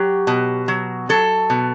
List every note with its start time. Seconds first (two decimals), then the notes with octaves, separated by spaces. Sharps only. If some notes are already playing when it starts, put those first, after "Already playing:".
Already playing: F#3 G4
0.27 B2
0.68 F#3
1.09 F#3 A4
1.50 B2